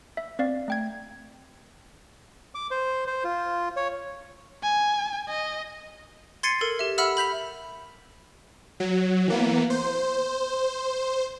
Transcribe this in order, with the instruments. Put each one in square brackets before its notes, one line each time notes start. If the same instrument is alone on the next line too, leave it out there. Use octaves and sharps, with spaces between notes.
[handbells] E5
C4 D5 F5
A3 G5 G#6
[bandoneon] D6
C5
C5
F4
C#5
[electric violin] G#5
D#5
[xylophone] C6 G#6 A6 C7 C#7 D#7
A4 A#4
G4 E5
E5 F#5 B5 E6 F6
B5 G6 B6 F7
[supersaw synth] F#3
E3 A#3 B3
C5